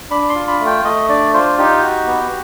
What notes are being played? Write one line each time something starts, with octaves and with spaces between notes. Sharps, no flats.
D4 B5
C6
F4
B5
A3
G5
A3 D#5
D4 D5
F4 C5
D#4 G4
F#4
B3